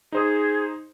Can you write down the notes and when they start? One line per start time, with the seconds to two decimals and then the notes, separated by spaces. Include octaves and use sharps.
0.12 D#4 G#4 C5 D#6